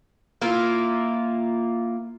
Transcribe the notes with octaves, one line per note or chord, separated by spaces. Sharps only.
A#3 E4 F4